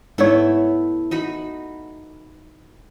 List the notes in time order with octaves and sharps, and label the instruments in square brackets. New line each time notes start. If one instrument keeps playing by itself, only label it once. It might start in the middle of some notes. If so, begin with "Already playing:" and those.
[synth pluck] G#2 C#5 [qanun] A3 B3 E4
[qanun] D#4 F#4 B5